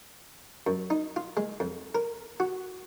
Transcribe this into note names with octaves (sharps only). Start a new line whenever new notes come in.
F#2
D#4
F4
G#3
F2
A#4
F#4